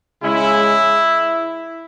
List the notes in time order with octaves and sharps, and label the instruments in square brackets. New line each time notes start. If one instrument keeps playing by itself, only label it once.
[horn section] C#3 G#3 C#4 E4